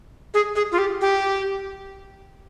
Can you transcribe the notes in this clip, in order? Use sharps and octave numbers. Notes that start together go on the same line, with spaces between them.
G#4
G#4
F4
G4
G4